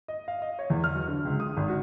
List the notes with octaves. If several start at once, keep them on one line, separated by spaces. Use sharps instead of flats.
D#5
F5
D#5
C#5
E2
F6
F#3
D3
C#2
D#6
G#1
F#4